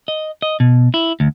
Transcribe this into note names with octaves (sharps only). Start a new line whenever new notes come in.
D#5
D#5
B2
E4
D2